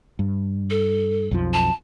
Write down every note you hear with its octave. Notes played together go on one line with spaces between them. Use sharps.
G2
A4
B1 F2 F3
A5